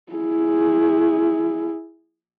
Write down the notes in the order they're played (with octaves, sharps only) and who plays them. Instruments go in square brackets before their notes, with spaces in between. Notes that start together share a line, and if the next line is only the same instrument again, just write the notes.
[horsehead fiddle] E4 G#4